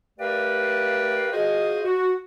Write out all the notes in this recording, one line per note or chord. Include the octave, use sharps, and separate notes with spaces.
A3 G4 A#4 B4 D5 F5
F4 F#4 G#4 C5 D#5
F#4